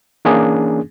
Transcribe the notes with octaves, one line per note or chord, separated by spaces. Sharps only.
E3 A#3 C#4 D4 G#4